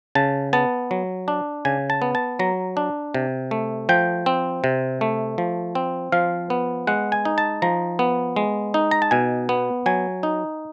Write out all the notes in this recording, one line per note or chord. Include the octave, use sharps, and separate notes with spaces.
C#3 A5
B3 A5
F#3
D4
C#3 G#5
A5
B3
A5
F#3 A#5
D4
C3
A3
F3 G5
C4
C3
A3
F3
C4
F3 F5
B3
G#3 F#5
G#5
D#4
A5
F3 A#5
B3
G#3
D#4
A#5
A5
B2 G#5
B3
F#3 G#5
D#4